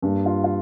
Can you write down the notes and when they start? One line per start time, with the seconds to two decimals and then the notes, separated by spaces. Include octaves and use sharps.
0.02 G2 G3 A#3
0.26 F4
0.44 F4